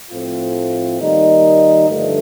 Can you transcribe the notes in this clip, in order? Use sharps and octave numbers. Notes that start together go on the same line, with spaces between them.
A2 F3 A3 C4 F4
D#3 G3 A#3 D#4
G2 D3 F3 A3